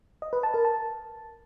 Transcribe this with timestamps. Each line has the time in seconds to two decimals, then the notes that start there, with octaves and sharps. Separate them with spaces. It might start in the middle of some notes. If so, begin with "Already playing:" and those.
0.22 D#5
0.33 B4
0.43 A5
0.54 A#4
0.65 A5